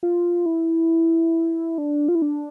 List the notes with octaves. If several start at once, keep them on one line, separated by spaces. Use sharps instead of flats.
F4
E4
D4
F4
E4
D4